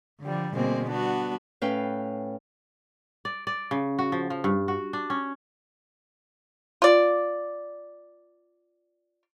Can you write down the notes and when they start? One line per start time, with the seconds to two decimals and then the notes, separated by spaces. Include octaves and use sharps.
0.20 D3 F3 G3
0.54 B2 D3 G3 G#3 A#3 C4
0.89 G3 B3 D4 F#4
1.61 A2 C#4 B4 F5 G5
3.25 D5
3.47 D5
3.71 C#3
3.99 F#4
4.12 F3
4.30 F3
4.44 G2
4.68 F#4
4.93 D4
5.10 C#4
6.82 F4 D5